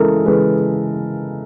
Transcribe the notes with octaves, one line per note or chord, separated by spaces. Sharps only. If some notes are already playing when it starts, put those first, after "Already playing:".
Already playing: C#3 E3 G#3 A4 A#4
C#3 E3 G#3 B4